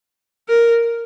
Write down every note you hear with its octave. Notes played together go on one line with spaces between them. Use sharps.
A#4